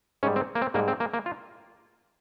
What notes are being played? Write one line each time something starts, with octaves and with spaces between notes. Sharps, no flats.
G#2 G3 C#4
C4
A#3
C4
G#2 G3 A#3
C4
A#3
A#3
F4